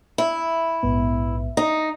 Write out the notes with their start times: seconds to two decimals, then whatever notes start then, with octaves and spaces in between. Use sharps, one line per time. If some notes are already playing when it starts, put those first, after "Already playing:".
0.18 E4
0.83 A#1 G#2 B3
1.57 D#4 A#6